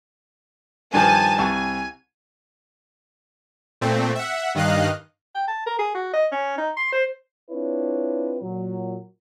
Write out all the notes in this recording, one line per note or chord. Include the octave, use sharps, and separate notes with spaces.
G2 D#3 F3 G#5 A5
C2 G#5 C#6
A#2 A3 C4
E5 F#5
G2 D#3 D#5 F5 F#6
G5
A5
A#4
G#4
F#4
D#5
C#4
D#4
C6
C5
C4 D4 E4 F4 B4 C#5
A#2 F#3